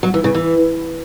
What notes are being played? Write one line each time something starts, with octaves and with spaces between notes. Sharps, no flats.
F#3
E3
C#3
E3